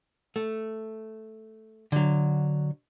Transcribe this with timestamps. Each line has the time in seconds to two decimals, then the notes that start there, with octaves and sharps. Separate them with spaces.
0.36 A3
1.92 D3 F#3